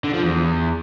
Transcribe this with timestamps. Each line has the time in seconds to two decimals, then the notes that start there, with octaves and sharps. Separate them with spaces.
0.04 D3
0.14 F3
0.23 E2